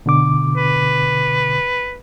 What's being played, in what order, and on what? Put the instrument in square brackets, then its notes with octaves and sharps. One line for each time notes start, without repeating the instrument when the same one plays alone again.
[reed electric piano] B2 D3 D6
[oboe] B4